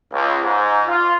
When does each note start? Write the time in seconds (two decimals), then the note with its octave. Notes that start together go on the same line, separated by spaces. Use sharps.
0.12 C#2
0.43 G#2
0.87 F4